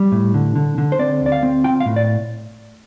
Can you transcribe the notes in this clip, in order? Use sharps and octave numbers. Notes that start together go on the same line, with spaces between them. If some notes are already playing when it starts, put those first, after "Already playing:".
Already playing: G3
A2
D3
D3
D3
C5
C4 D5
D2 D5
F5
C4
F4 G5
F5
A2
D5